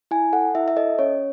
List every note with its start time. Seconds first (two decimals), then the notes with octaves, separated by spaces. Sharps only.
0.11 E4 G#5
0.33 A4 F#5
0.55 E4 E5
0.68 E5
0.76 A4 D#5
0.99 C#4 C#5